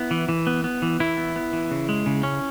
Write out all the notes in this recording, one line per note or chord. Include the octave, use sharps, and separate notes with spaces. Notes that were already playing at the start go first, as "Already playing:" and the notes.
Already playing: B3 E4
E3
E3
B3
B3
E3
E3 E4
B3
B3
E3
C#3
G#3
C#3
C#4